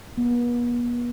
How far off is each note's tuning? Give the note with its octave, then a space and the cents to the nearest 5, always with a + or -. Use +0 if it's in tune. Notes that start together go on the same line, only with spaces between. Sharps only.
B3 -40